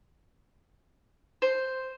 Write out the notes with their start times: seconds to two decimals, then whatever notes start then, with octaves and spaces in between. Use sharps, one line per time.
1.42 C5